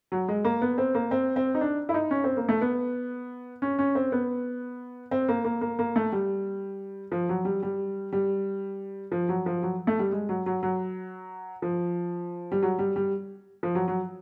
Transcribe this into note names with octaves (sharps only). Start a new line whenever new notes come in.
F#3
G#3
A#3
B3
C4
A#3
C4
C4
D#4
D4
E4
D#4
C#4
C4
A#3
A3
B3
C#4
C#4
C4
B3
C4
A#3
A#3
A#3
A#3
A3
G3
F3
F#3
G3
G3
G3
F3
F#3
F3
F#3
A3
G3
G#3
F#3
F#3
F#3
F3
G3
F#3
G3
G3
F3
F#3
F#3